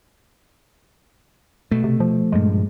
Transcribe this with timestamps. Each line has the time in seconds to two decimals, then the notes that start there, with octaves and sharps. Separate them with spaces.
1.71 B2 A3
1.84 C3
2.00 F3
2.32 G2 A#2 F3 G#3